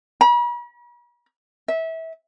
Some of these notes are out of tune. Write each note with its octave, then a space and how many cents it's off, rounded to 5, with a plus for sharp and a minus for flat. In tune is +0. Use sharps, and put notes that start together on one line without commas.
B5 -45
E5 -25